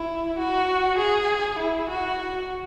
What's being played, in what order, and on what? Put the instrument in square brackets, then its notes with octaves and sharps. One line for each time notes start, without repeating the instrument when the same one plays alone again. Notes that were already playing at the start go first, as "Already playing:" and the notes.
Already playing: [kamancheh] E4
F#4
G#4
E4
F#4